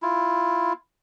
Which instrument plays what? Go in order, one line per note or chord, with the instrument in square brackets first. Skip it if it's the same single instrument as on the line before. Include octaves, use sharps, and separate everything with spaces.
[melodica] E4 F4